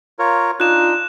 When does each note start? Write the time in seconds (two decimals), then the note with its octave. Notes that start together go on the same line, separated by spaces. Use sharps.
0.19 F4 A#4 C#5
0.60 D4 D#4 F4 F#6 E7